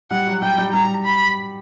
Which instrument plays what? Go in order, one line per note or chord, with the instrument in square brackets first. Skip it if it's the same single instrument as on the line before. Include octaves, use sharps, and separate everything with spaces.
[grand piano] G3 [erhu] F#5
[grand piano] F#3
[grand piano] G3 [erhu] G5
[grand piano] G3
[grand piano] G3 [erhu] A#5
[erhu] B5